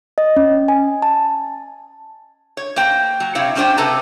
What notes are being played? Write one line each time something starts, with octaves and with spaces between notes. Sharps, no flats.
D#5
C#4
G#5
A5
C#5
A#3 C5 G5
F#3
C3 E4 C#5 F5 G5
G3 C#4 D4 G#4 C5 G5
C3 A4 B4 A#5